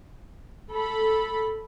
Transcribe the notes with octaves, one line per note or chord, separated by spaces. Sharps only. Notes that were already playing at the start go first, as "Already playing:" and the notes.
A4 B5